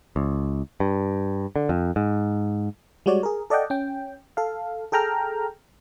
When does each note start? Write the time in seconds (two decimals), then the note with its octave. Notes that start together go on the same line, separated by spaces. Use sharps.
0.16 C#2
0.80 G2
1.56 D3
1.69 F2
1.96 G#2
3.06 G3 G#3 F#4 C#5 D5
3.23 G#4 A#4
3.50 A4 D5 D#5 F#5 G5
3.70 C#4 G5
4.37 A4 F5
4.92 G#4 A4 G5 A#5 F6